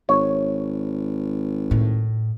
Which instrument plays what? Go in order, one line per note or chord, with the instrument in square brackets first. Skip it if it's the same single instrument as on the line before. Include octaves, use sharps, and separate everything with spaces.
[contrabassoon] G#1 [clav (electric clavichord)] C#5
[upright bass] A2